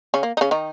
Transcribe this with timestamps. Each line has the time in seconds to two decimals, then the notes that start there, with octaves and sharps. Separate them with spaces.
0.14 C#3 C#4
0.23 A#3
0.37 D#4
0.41 C#3 C#4
0.51 D#3 D#4